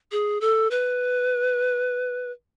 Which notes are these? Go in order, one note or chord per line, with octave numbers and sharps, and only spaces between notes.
G#4
A4
B4